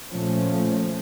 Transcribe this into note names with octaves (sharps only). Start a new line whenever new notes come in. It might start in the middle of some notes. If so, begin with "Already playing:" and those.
A#2 F3 A3 C#4